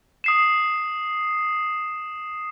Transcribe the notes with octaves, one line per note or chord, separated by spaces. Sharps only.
D#6 C7 E7